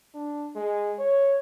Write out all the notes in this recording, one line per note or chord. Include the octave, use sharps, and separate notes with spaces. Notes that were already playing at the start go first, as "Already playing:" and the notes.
D4
G#3
C#5